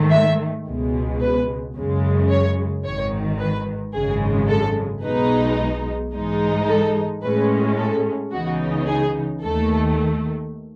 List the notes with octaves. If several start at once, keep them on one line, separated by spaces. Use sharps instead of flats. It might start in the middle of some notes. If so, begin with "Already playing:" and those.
Already playing: G#2 D#3 A3
E5
C#2 B2 G#3
B4
F#2 C#3 G#3
C#5
G#1 G#2 D#3 C#5
B4
G#1 F#2 C#3 G#3 G#4
A4
B1 B2 G#3 D#4 B4
G#2 E3 G#3 D#4
A4
A2 G#3 C#4 B4
A4
C#2 C#3 E3 B3 D#4 F#4
G#4
D#2 D#3 A3 A4